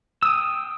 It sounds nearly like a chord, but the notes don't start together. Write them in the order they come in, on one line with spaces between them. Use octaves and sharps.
E6 D#6 G5